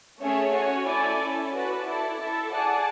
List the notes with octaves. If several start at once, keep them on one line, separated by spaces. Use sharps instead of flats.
A3 C#4 G#4 C#5 E5
C#4 F#4 C#5 G#5
A3 E4 A4 D5 G#5
C#4 E4 A4
F#4 B4 D5 A5
E4 A4 D5 A5
E4 A4 E5
G#4 D5 F#5 A5